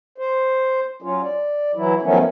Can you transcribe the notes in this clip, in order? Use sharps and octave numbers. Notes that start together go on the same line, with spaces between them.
C5
F#3 C#4 F4
D5
E3 F#3 E4
D#3 F3 F#3 A3 B3 C#4